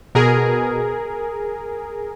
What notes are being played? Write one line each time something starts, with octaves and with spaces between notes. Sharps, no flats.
B2 G#4 A#4